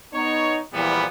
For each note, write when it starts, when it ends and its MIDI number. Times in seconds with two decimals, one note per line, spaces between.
0.14 0.57 59
0.14 0.57 63
0.14 0.57 73
0.74 1.05 40
0.74 1.05 46
0.74 1.05 52
0.74 1.05 53
0.74 1.05 55
0.74 1.05 59